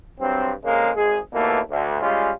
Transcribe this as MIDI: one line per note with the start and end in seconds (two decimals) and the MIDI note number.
0.20 0.51 43
0.20 0.51 54
0.20 0.51 60
0.62 0.89 41
0.62 0.89 49
0.62 0.89 56
0.62 0.89 58
0.95 1.18 32
0.95 1.18 56
0.95 1.18 68
1.32 1.59 39
1.32 1.59 47
1.32 1.59 52
1.32 1.59 57
1.32 1.59 58
1.70 2.01 38
2.02 2.29 55
2.02 2.29 56
2.02 2.29 61
2.02 2.29 65